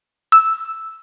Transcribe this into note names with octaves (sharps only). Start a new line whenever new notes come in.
E6